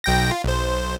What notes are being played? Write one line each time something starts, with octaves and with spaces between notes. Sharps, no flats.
B1 G5 A#6
F4
B1 C5